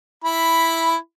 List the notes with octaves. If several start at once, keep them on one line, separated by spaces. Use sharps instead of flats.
E4 B5